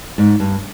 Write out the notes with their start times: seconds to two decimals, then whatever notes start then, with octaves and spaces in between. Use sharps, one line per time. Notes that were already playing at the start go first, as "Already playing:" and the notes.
0.18 G#2
0.40 G2